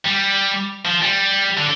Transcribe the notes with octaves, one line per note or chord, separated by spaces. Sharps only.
G3
F3
G3
D3